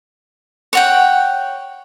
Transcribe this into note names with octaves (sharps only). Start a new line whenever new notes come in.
C#5 F#5 G5